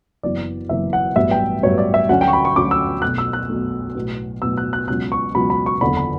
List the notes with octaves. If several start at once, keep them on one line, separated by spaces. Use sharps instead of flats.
F#1 F#2 E3 B3 D5
F#1 F#2 E3 B3 E5
F#5
A1 G2 F#3 B3 E5
G5
A1 G2 F#3 B3 C#5
D5
E5
D2 D3 F#3 A3 C#4 F#5
G5
C#6
B5
C#6
D2 D3 F#3 A3 C#4 D6
E6
B1 B2 A3 F#6
E6
F#6
B1 B2 A3
B1 A2 F#3 B3
B1 A2 F#3 B3 E6
F#6
F#6
C#2 B2 F#3 C#4 F#6
C#6
C#2 B2 F#3 C#4 B5
B5
C#6
F#1 E2 D3 B5
B5